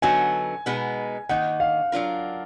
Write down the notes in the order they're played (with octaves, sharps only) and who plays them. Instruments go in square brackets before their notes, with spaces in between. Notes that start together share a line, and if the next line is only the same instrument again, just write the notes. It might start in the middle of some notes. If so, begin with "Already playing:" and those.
[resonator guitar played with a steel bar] D3 F#3 B3 D#4 F#4 [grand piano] G#5
[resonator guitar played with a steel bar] B2 G#3 B3 D#4
[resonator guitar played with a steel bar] D#3 A#3 D#4 [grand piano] F#5
[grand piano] F5
[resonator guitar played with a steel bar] F#3 D4 F4 A#4